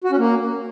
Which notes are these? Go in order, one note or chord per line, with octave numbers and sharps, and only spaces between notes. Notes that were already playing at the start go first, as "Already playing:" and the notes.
F#4
C#4
A#3